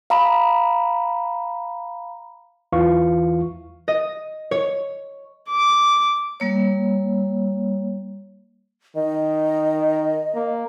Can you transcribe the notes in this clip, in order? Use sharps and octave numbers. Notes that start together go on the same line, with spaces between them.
F5 A#5 B5
E2 E3 F4 F5 C#6
D#5
C#5
D6
G3 A#3 C#5
D#3 D#5
A#3